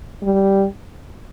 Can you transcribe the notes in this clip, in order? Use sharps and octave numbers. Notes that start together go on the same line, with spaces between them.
G3